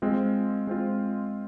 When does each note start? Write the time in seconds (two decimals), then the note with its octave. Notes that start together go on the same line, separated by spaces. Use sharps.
0.02 G#3 C4 F4
0.67 G#3 C4 F4